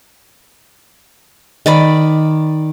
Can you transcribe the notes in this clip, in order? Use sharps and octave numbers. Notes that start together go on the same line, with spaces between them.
D#3 D5 B5